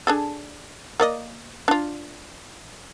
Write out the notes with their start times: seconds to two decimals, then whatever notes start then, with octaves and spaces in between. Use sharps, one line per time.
0.07 D4 G#4 A4
1.00 A#3 D5 D#5
1.68 D4 F4